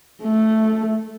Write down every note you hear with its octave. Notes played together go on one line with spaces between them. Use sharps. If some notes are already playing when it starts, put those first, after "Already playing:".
A3